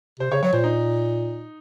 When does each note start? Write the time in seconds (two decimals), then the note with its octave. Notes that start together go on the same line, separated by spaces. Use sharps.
0.20 C3 C5
0.31 C#3 C#5
0.43 F#3 C#5
0.53 A#2 C5
0.64 D#4